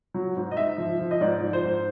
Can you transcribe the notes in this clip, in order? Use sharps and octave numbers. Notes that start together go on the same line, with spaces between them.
F#3
G#2
D#5
G#2 E5
F3
F3
D#5
G#2 D5
F3
C5
G#2